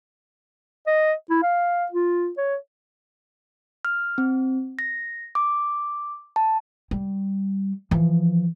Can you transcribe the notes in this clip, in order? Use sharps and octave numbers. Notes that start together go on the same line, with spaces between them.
D#5
E4
F5
F4
C#5
F6
C4
A#6
D6
A5
G3
E3 F3